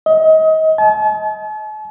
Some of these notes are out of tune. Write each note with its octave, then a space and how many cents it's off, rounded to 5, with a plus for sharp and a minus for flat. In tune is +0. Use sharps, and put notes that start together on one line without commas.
D#5 +30
A5 -45